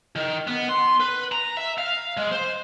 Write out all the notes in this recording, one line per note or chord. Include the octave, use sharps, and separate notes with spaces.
D#3
B3
C6
B4
A#5
E5
F5
G#3
C5